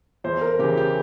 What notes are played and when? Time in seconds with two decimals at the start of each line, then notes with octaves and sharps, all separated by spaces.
0.24 E2 C5
0.41 A#4
0.59 C#3 E3 G4
0.77 G4